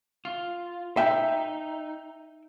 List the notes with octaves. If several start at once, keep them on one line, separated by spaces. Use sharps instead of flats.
F4
D#4 E5 G5